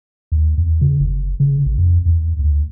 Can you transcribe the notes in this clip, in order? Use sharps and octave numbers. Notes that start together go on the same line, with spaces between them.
D#2
E2
C#3
F#1
C#3
A1
F2
E2
D2